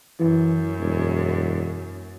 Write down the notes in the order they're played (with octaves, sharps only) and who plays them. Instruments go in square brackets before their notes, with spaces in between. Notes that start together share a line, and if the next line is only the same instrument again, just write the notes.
[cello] F#2 [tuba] E3
[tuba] E1